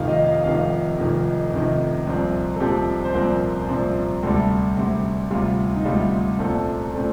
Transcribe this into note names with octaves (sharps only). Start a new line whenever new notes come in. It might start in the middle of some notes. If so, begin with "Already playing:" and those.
Already playing: F1 F2 C3 D#3 F5
D#5
F5
F1 F2 C3 D#3 F5
F1 F2 C3 D#3
F1 F2 C3 D#3
C2 A#2 F3 C4
A4
C2 A#2 F3 C4 G4
C5
C2 A#2 F3 C4 A#4
C2 A#2 F3 C4
D2 C3 G3 A4
D2 C3 G3
D2 C3 G3 F4
D#4
D2 C3 G3 F4
C2 A#2 A3 C4 A4
A#2 A3 C4